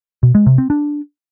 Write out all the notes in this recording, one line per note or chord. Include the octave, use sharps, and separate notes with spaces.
B2
G#3
C3
C4
D4